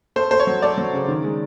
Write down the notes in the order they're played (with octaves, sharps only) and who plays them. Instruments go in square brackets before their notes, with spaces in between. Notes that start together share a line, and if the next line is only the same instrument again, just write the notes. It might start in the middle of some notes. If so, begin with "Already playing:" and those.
[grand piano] A3 C5
A3 C5
C#5
F#3
A3 D5
F#3
C#3
D#3
G#3